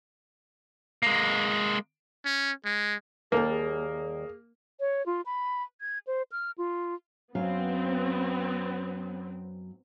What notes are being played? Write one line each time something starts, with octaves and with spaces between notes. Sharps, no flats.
G#3 A#3
C#4
G#3
D#2 G3 A#3 A4
G#4
C#5
F4
B5
G#6
C5
F6
F4
F#2 F#3 B3 C4 F5